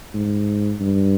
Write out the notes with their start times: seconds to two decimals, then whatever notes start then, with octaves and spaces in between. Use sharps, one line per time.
0.14 G#2
0.80 G2